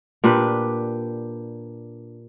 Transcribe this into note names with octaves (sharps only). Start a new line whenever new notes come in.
A#2 D4 G4 B4